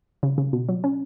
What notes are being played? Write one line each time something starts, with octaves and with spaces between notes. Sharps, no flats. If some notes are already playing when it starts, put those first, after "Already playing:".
C#3
C#3
B2
F#3
C#4